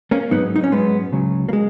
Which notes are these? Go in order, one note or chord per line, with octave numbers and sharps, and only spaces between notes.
A#3 C#4
G#2 F#3 B3 D#4
D#4
C#4
G#2 F#3 G#3 B3
C#2 C#3 F#3
A#3
G#3